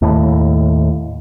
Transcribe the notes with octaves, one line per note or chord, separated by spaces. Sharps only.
D#2 A2